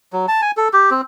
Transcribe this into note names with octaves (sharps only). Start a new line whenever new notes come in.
F#3
A5
G#5
A4
G4
C4